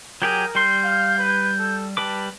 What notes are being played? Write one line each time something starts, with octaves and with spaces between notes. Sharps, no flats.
F#3 G4 G#4 A#4 G6
G3 C6 G6
F5
B4
A4
G3 B4 A5 D6